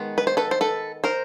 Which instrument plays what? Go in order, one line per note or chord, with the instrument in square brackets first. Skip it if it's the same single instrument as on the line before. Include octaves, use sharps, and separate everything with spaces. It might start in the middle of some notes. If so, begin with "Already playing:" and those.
Already playing: [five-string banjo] D#3 G#3 B3
B4
C5
A4 B4
C5
A4 B4
A#4 C5